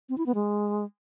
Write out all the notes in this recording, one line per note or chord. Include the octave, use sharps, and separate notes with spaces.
C4
E4
B3
G#3